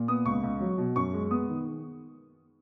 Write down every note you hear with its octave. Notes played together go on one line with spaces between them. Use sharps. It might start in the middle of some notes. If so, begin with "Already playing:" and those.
Already playing: A#2
B3 D#6
C#2 C#6
C#2
F#3
B2
F#2 C#6
G#3
B3 D#6
D#3